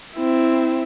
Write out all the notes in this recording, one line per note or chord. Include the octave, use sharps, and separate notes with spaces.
C4 E4